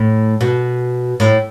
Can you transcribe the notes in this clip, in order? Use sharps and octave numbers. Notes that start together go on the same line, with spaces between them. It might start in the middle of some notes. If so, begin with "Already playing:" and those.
Already playing: A2
B2
A2